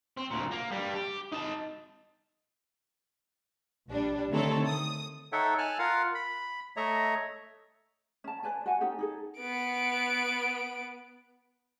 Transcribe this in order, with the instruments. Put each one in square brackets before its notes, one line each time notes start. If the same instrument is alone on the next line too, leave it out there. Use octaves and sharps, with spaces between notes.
[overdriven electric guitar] C4
D2 A#2
A#3
G3 D4
G4
D#4 A5
[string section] A#1 G3 D4
D3 D#3 A3 C4 A4 C#5
D#6
[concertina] D#4 A4 C#5 E5 F#5 G5
G#5 A5 F6 F#6
F4 A#4 F5 F#5
B5
A3 C#5 D#5 E5 A#5
[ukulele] C#4 A5
B4 D5 G#5 A5
F#4 F#5 G#5
C#4 D#4 G4 A4
D#4 G#4 A4
[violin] B3 D7